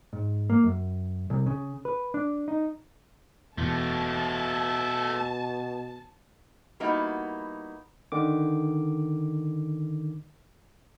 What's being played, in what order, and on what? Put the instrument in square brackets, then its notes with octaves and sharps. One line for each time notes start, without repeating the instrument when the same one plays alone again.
[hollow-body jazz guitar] G#2
A#3
F#2
C2
C#3
B4
D4
D#4
[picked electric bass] E1 E2 [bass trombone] B2 [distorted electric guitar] A3 F4 [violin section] A5
[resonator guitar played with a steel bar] G3 A#3 B3 D#4 E4 F#4
[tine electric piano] D3 D#3 D6